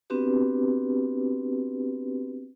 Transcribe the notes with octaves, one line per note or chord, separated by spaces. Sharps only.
B3 C4 D4 F#4 G4 B4